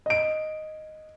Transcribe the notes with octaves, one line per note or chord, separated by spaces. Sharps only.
D#5 D7